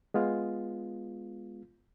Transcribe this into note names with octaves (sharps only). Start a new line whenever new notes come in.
G#3 B3 F4